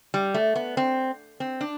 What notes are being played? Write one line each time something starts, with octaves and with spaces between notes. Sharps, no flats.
G3
A3
B3
C4
C4
D4